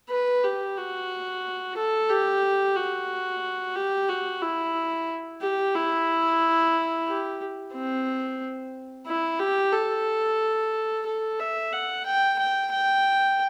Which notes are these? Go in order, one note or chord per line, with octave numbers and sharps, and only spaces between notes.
B4
G4
F#4
A4
G4
F#4
G4
F#4
E4
G4
E4
G4
C4
E4
G4
A4
A4
E5
F#5
G5
G5
G5